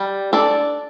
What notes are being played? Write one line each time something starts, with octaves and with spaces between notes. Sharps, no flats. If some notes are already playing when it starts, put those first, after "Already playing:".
Already playing: G3
D4 A4 D5